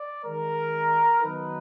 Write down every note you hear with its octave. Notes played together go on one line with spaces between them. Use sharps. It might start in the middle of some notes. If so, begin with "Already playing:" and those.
Already playing: D5
D#3 G#3 D#4 A#4
D#3 F#3 B3 D#4 B4